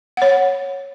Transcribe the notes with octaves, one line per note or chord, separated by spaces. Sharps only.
C#5 F#5